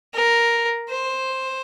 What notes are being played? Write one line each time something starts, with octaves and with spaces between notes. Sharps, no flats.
A#4
C5